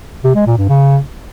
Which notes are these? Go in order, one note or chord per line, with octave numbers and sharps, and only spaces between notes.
C3
G#3
A#2
G2
C#3